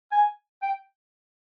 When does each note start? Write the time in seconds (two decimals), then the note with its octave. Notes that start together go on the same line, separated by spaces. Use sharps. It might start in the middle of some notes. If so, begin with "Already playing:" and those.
0.12 G#5
0.62 G5